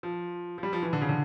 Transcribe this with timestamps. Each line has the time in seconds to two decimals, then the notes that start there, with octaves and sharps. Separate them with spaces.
0.03 F3
0.58 F3
0.63 G3
0.73 F3
0.83 E3
0.93 D3
1.02 C#3
1.09 D3